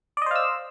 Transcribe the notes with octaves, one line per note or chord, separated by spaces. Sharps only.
C5 D5 D#5 F5 E6